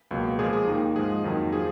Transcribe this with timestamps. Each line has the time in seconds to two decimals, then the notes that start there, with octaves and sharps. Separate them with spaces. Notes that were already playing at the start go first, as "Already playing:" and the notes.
0.11 C#2 B2 F#3 A#3
0.39 A#2 F3 G#3 G#4
0.53 G#4
0.68 D#2 D#3 A#3
0.95 G#2 F3 G#3 G#4
1.24 F2 D#3 F#3 A#3
1.52 F3 G#4